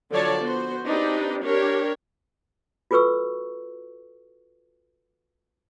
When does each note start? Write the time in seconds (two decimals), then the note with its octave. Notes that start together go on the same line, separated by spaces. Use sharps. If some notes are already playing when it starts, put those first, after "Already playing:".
0.11 D3 F3 F#3 C#5 D5 A5
0.39 B3 F#4 C5
0.85 C4 D4 D#4 G4 B4
1.44 D4 G4 A#4 C#5
2.91 F4 F#4 A4 B4 C#6 E6